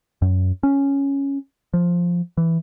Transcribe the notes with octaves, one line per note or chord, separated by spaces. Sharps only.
F#2
C#4
F3
E3